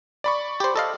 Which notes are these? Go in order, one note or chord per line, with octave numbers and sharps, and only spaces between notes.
D5 B5 C#6
G4 C5
A4 D#5 F5